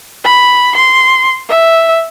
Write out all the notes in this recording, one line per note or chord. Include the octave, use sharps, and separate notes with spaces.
B5
C6
E5